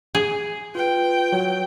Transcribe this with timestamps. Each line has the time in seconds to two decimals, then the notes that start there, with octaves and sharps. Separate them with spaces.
0.15 G#4
0.75 F4 B4 G5
1.32 F#3 F#4